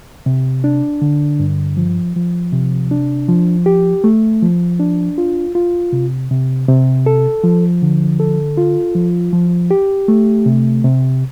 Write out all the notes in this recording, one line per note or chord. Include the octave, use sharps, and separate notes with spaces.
C3
D4
D3
G2
F3
F3
C3
D4
F3
G4
A3
F3
D4
F4
F4
C3
C3
C3
A4
F3
D3
A4
F4
F3
F3
G4
A3
C3
C3